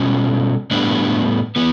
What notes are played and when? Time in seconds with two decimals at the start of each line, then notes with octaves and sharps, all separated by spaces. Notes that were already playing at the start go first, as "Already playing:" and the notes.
Already playing: B2 G3 C#4
0.71 A2 G3 B3 D4
1.56 E3 B3